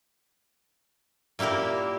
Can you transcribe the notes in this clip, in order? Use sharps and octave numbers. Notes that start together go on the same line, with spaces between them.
A#2 A#3 E4 G4 A#4